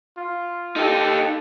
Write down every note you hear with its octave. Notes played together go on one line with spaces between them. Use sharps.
F4
D#4 G4 A4